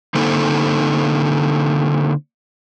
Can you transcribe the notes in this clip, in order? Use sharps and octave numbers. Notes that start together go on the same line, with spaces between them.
D3 A#3 C4 D#4 A4